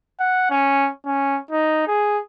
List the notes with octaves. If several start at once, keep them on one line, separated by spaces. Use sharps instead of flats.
F#5
C#4
C#4
D#4
G#4